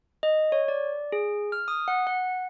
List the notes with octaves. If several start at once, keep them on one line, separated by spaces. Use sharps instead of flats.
D#5
C#5
D5
G#4
F6
D#6
F#5
F#5